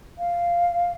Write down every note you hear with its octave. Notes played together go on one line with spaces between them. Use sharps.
F5